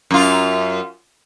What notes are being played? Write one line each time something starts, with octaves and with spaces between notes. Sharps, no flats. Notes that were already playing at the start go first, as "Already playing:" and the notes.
F#2 F4